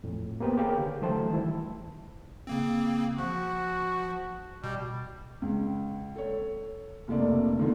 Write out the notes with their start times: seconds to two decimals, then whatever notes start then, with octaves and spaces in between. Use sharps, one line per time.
0.04 F2 A2
0.40 A#3 B3 G4 B4 C5 G5
0.57 G4 G#4 A#4 C#5 F5 G5
0.78 D3
1.01 E3 F#3 A3 C5 A5
1.30 D#3 E3 G3 E4
2.47 C#3 A#3 C4
3.18 F3 F#4
4.64 B2 G3
5.42 C#2
6.16 A4 C#5
7.08 F1 D2 A3 A#3 D5
7.58 D3 D#3 A#3 B3 F4 A4